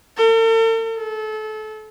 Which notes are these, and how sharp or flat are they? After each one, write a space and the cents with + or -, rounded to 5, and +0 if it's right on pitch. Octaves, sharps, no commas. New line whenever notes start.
A4 +45
A4 -30